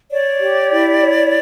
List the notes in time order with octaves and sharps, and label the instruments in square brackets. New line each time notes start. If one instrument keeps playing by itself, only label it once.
[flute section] C#5 D5
G4
E4
C#5